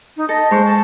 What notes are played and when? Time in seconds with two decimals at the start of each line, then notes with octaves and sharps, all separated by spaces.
0.17 D#4
0.29 A4 D#5
0.51 G#3 C5 C#6
0.65 A5